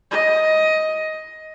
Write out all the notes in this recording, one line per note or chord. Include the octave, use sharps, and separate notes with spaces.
D#5